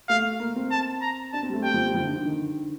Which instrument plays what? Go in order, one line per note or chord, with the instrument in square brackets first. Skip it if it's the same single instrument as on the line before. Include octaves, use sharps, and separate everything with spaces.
[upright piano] A3 [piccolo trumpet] F5
[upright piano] A#3
C4
[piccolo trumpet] A5
A#5
[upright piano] D4 [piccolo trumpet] A5
[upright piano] C4
G3
A3
[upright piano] G3 [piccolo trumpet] G5
[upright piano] F3
G3
F3
D#3
D3
D3
D#3